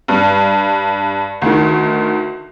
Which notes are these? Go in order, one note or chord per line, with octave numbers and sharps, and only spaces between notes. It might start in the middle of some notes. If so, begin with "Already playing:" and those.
G2
D2 D#3